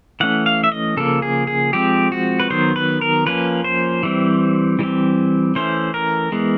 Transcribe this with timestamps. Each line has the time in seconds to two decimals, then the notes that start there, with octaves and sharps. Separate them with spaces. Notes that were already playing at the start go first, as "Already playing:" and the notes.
0.20 E3 A3 C#4 F#5
0.46 F5
0.64 E5
0.72 D#5
0.97 C#3 F3 A#3 A4
1.22 G#4
1.47 G#4
1.73 F3 G#3 C4 G4
2.12 F#4
2.40 B4
2.50 D#3 F#3 B3 C5
2.76 B4
3.01 A#4
3.26 F3 A#3 C#4 B4
3.64 C5
4.03 E3 G3 C4
4.79 E3 G3 C4
5.55 E3 A3 C#4 C5
5.94 A#4
6.32 E3 G#3 B3